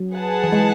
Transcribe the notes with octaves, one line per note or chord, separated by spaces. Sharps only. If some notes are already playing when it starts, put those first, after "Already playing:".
Already playing: F#3
G#4 B4 F#5 A5
E3
G#3